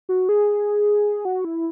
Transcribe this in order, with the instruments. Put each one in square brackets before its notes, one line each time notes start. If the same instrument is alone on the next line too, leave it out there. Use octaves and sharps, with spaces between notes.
[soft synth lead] F#4
G#4
F#4
E4